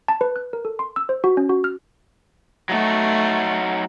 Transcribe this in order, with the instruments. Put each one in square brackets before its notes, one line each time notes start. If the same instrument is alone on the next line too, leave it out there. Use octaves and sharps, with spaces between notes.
[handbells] A5
B4
F#6
A#4
A4
C6
E6
C5
F#4
C#4
F#4
F6
[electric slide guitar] F#3 D#4 F#4 [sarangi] A3